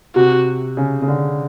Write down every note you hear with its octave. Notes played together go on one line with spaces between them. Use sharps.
C3 F#4
C#3
C#3
D3